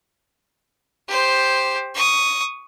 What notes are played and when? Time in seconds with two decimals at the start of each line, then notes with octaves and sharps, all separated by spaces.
1.08 G4 C5
1.94 C#6 D#6